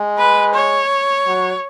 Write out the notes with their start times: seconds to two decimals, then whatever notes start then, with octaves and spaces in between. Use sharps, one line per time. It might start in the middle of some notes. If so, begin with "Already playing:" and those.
Already playing: G#3
0.18 B4
0.54 C#5
1.27 F#3